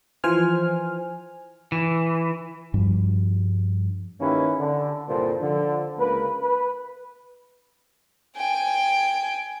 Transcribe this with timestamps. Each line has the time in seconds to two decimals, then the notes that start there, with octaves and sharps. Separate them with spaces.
0.24 E3 F3 C5 G#5 F6
1.72 E3
2.74 G2 F3 G3
4.21 D#3 A#3 C#4 E4 G4 B4
4.59 D3
5.08 C2 G2 A#2 A4 C5
5.41 D3 F3
5.98 C#2 A#3 A#4 B4
6.42 B4
8.37 G5 G#5